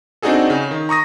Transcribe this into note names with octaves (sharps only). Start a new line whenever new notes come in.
C4 D4 D#4 F#4 G#4 A4
C#3
D#3
A#5 C#6 D#6 A#6